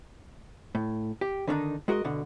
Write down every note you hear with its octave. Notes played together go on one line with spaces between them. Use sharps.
A2
G4
D3 D#3 A3 D4 D#4
G#3 F#4 A#4 C#5 D#5
D2 B2 D3